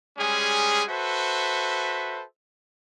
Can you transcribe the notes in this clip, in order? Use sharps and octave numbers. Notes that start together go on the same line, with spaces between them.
G3 G#3 C#4 G#4
F#4 A4 B4 C5 E5